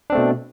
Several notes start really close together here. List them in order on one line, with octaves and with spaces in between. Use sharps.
D4 C4 A3 B2